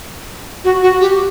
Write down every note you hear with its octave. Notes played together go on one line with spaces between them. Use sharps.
F#4
F#4
G4